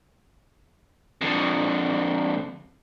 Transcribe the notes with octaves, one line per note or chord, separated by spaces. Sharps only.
F2 D3